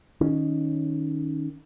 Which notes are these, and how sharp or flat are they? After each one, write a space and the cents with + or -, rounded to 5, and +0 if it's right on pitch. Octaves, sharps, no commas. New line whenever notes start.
D#3 -10 C#4 +0